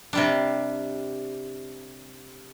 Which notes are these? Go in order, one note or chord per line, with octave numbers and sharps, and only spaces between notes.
C3 G3 D4